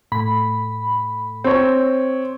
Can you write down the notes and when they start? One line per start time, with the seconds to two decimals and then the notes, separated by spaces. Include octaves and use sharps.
0.12 A2 B5
1.44 C4 C#5